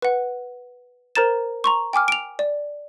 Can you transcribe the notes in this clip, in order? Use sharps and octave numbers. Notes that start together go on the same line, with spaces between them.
B4 F#5
A#4 C5 A#5 A6 E7
A#5 C6 C#6
G5 G#5 D6 F6
D7 F7
D5